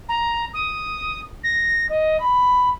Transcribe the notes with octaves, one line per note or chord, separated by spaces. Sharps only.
A#5
D#6
A#6
D#5
B5